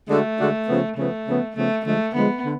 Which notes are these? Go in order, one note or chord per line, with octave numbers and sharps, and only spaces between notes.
D3 G#3 A3 D4 F#4 A4
D3 G#3 D4 F#4 A4
C#3 F3 B3
C#3 F3 A3 B3
C#3 F3 B3
C#3 F3 A3 B3
D3 F3 G#3 A3
D3 F3 G#3 B3
D3